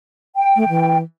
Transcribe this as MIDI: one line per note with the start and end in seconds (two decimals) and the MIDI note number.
0.36 0.98 79
0.56 0.64 57
0.69 1.02 52